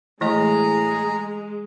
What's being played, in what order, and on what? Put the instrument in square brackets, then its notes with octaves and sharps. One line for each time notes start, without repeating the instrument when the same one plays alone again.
[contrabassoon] A2 [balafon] E3 A3 D#5 [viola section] G#3 [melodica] G#4 A#5